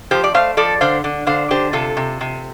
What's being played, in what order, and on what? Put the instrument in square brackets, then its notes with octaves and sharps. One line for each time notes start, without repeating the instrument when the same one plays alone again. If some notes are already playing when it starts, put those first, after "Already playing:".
[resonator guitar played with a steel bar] F3 G4 C5
D5
A3 C5 F5
F3 A4 D5
D3 C5 F5
D3
D3 C5 F5
D3 G4 C5
C3 F4 A4
C3
C3